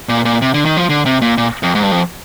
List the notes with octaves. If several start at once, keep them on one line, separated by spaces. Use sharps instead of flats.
A#2
A#2
C3
D3
D#3
F3
D3
C3
A#2
A#2
F2
G#2
G2
F2